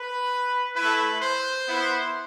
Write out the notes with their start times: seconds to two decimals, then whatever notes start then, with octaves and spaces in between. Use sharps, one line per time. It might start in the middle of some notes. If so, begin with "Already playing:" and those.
Already playing: B4
0.75 A3 E4 B4
1.21 C5
1.67 B3 E4